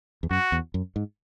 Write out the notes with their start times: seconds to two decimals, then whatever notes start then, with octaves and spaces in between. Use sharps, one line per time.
0.23 E2
0.30 F#2 F#4
0.52 E2
0.74 F#2
0.96 G#2